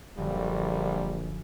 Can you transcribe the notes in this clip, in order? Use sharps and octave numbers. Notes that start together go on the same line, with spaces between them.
D#1 A#1 F#2 D3 F3 G3